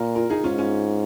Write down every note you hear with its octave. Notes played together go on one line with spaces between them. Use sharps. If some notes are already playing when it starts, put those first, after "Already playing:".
Already playing: A#2 F4 A#4
F4 A#4
D#4 G#4
G#2 C#4 F4
C#4 F4